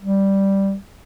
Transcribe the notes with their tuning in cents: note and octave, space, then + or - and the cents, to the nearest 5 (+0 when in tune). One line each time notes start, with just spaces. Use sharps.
G3 +0